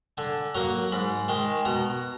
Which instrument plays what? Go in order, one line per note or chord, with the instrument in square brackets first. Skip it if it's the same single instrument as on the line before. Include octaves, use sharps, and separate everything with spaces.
[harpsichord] D3 G#5
F#3 A#3 A#5
G#2 B5
D#3 G#3
B2 A#5